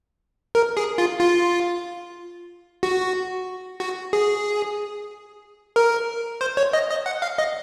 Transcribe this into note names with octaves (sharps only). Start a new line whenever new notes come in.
A#4
G#4
F4
F4
F#4
F#4
G#4
A#4
C5
C#5
D#5
D#5
F#5
F5
D#5